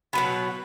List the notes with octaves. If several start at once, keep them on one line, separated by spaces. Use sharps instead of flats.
B2 F#3 B3 B5